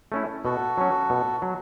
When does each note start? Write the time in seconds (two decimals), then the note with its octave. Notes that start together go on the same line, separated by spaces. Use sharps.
0.12 A3 C#4 E4
0.44 B2 F#4 A4
0.78 F#3 C#4
1.10 B2
1.42 F#3